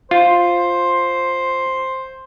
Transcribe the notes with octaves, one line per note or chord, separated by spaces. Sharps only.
F4 C5